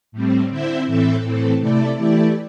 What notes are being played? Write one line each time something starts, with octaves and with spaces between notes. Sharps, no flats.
A2 G3 C4
D3 C4 E4 C5 E5
A2 E3 C4 A4 E5
A2 E3 C4 A4
C3 A3 E4 A4 D5
E3 A3 E4 G4 D5